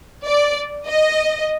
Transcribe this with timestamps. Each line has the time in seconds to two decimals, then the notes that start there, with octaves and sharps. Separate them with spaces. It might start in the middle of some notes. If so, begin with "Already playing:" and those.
0.25 D5
0.87 D#5